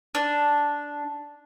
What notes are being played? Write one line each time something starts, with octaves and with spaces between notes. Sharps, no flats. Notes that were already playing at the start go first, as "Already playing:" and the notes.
D4